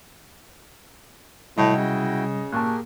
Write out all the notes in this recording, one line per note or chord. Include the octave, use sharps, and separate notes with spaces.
A2 C3 G3 E4 F#4 D#5 G5
C#3
A#2 G4 G#4 A#4 A5 C#6 F#6